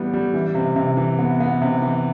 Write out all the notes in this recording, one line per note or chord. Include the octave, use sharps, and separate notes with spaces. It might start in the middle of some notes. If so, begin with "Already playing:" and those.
Already playing: A2 E3 G3 B3
G3
E3
C3
C3
E3
B3
B3
C3
E3